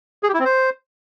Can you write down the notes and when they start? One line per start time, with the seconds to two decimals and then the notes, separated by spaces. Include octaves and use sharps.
0.23 G#4
0.29 G4
0.34 E4
0.39 C4
0.45 C5